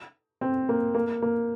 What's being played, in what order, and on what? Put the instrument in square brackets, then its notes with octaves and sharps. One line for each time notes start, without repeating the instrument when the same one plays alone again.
[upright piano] C4
A#3
A#3
A#3